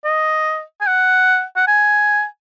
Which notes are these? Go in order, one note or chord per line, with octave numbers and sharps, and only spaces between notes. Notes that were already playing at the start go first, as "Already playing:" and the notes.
D#5
G#5
F#5
F#5
G#5